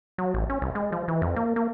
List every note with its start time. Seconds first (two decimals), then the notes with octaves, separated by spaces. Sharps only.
0.18 F#3
0.34 A1
0.50 C#4
0.62 C2
0.75 G#3
0.92 F3
1.08 E3
1.22 F2
1.36 A#3
1.56 A#3